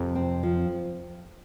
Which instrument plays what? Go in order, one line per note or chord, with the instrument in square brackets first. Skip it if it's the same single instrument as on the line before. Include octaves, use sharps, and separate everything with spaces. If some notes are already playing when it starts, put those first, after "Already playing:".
Already playing: [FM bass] F2 [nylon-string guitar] C3
[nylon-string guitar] C4
F3